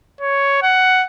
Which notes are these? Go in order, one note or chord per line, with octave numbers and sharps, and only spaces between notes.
C#5
F#5